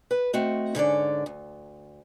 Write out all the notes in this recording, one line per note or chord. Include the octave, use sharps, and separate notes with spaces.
B4
A3 C4 F#4 D#5
G#2 D3 C#4 D5
D2